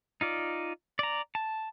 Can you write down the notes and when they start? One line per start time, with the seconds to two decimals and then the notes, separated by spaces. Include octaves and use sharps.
0.21 D#4 F4 D5
0.99 D5 A#5
1.35 A5